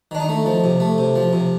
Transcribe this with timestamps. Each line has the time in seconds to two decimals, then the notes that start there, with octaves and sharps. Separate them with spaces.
0.11 D#3 D4
0.20 D#4
0.29 A3
0.46 F3
0.64 C3
0.80 A3
0.98 C3
1.16 F3
1.33 C3